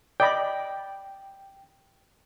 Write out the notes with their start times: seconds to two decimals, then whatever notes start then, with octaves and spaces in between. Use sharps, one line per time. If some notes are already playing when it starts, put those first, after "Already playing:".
0.20 D5 D#5 G5 B5